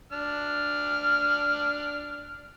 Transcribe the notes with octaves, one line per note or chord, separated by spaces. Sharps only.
D4 F6